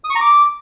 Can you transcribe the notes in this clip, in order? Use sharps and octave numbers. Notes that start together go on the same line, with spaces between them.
D#6
C#6
A#5
D6